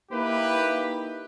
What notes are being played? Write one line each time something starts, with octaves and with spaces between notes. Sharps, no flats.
A#3 D#4 E4 G4 B4